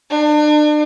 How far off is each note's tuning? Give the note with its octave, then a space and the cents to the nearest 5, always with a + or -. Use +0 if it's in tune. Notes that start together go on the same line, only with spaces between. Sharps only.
D4 +40